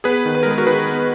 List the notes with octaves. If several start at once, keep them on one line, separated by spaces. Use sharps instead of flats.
B3 G#4 B4
D#3
B4
A#4
G#3
G#4
F#4 A#4
D#3 G#4 B4
B3